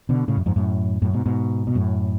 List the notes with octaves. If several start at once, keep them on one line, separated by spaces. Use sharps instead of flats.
B2 D3
A2 C#3
F#2
F2 G#2
F#2 A2
F#2 A2
G#2 B2
G#2 B2
B2
F#2 A2